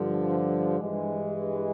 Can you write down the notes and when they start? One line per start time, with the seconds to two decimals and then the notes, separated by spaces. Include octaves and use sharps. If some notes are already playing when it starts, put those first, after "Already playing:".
Already playing: G2 D3 F3
0.80 G2 E3 G#3